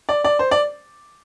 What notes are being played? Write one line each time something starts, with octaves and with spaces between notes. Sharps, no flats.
D5
D5
C5
D5